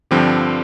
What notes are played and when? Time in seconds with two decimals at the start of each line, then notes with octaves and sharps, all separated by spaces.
0.11 G2 D3 F3 C4 G4